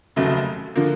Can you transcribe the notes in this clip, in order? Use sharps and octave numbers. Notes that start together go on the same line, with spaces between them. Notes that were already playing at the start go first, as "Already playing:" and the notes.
F1 D#2 C#3 F#3 A3
D3 F3 A#3